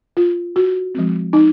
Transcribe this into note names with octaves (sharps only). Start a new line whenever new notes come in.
F4
F#4
F3 G#3 C4
D#4